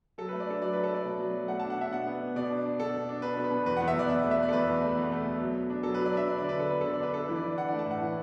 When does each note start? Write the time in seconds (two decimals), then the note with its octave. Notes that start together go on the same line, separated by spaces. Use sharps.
0.18 F#3 A4
0.29 A3 B4
0.40 D5
0.47 D4 A4
0.62 F#3 D5
0.73 F#3 B4
0.84 A4
0.90 A3 D5
1.05 B2
1.20 F#3
1.34 F#3
1.48 A3 F#5
1.60 D4 A5
1.70 F#5
1.78 D4 E5
1.92 B2 F#5
2.07 B3
2.21 B3
2.36 B2 D5
2.51 D4
2.65 D4
2.79 B2 A4
2.94 B2
3.09 D4
3.22 D4 B4
3.37 B2
3.44 B4
3.51 B2
3.66 E2 B4
3.77 E2 F#5
3.88 E5
3.96 E2 D5
4.10 B2 E5
4.24 A3
4.31 E5
4.38 A3 D5
4.48 A4
4.53 E2 B4
4.67 E2
4.82 A3
4.97 E2
5.12 A3
5.25 B2
5.40 F#3
5.55 B3
5.70 D4
5.83 F#3 A4
5.94 F#3 B4
6.05 D5
6.13 D4 E5
6.28 D4 D5
6.38 D3 D5
6.49 B4
6.56 D3 A4
6.70 B3 B4
6.81 D3 A4
6.93 D5
7.00 D4 B4
7.14 D4 A4
7.25 E3 B4
7.36 D5
7.43 E3
7.57 D4 F#5
7.68 A3 D5
7.79 A5
7.86 A2 F#5
8.01 E3